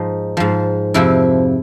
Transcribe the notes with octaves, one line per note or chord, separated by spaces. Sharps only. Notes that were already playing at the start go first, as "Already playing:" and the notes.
Already playing: G#2 F3 D#4
G#2 F3
F2 C3 F3 E4